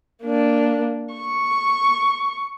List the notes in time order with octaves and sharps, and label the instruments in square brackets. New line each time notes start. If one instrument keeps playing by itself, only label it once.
[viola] A#3 D4
C#6